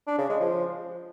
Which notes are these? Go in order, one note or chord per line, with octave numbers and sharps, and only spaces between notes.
D4
C#3
G#3
F3